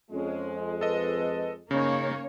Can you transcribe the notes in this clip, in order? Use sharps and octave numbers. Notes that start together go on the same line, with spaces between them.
F2 G#3 C#4
A4 B4 D#5
C#3 A#3 C#4 D#4 C#5